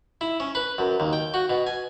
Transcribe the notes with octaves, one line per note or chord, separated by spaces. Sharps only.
E4
C#4
B4
F#2
D#2
G5
F#4
B2
G#5